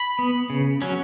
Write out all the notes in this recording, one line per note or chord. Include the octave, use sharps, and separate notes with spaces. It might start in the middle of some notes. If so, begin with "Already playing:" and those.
Already playing: B5
B3
C#3
F#3 C#4